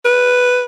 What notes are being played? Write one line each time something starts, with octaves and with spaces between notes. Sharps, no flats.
B4